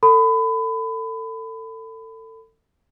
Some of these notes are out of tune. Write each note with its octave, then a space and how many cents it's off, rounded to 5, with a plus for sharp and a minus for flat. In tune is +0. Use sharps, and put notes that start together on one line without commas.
A4 +30 B5 +30